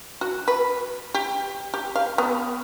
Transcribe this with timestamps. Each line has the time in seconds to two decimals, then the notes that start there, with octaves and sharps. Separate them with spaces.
0.21 F#4
0.48 B4
1.14 G4
1.74 G4
1.96 F5
2.18 B3